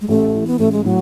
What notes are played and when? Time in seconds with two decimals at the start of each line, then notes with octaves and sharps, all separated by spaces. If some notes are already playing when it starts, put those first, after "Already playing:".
0.01 G#3
0.08 A1 A3
0.34 E3
0.47 B3
0.59 A1 A3
0.72 G#3
0.84 A2 F#3